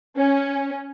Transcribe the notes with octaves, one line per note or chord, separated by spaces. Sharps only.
C#4